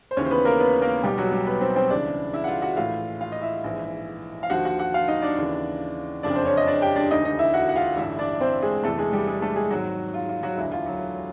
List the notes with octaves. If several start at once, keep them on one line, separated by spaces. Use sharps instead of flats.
C5
D#2 C#3 E3 C#4 C#5
C5
B3 B4
A#3 A#4
B3 B4
A#3 A#4
B1 B2 G3 G4
F#3 F#4
G3 G4
B3 B4
C4 C5
C4 C5
C#2 C#3 E3 D4 D5
E4 E5
F#5
F4 F5
F#4 F#5
A#1 A2 E3 F4 F5
F4 F5
D#5
E4 E5
A#1 G#2 E3
F5
D#2 D3 F3 F#4 F#5
F#4 F#5
F#4 F#5
F4 F5
D#4 D#5
D4 D5
D#2 C#3 E3
F#1 F2 C#3 F3 D4 D5
C5
C#4 C#5
D#5
D4 D5
G4 G5
D4 D5
E1 D2 D3 D#4 D#5
D#4 D#5
E4 E5
F#4 F#5
F#5
F4 F5
A1 G2 D3 E4 E5
D4 D5
C4 C5
G#3 G#4
E2 C3 E3 A3 A4
G#3 G#4
G3 G4
G#3 G#4
A3 A4
G#3 G#4
G#1 G#2 D#3 F#3 F#4
F4
F4
F#3 F#4
E1 D2 D3 E4
F4
F#3 F#4